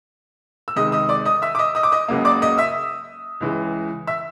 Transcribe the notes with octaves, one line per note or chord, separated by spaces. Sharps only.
E6
C#2 C3 D#3 G#3 D#5 D#6
D#5 D#6
D5 D6
D#5 D#6
E5 E6
D6
D#5 D#6
D#5 D#6
D6
D#5 D#6
C#2 C#3 F#3 A#3
D5 D6
D#5 D#6
E5 E6
C#2 C#3 E3 G#3
E5 E6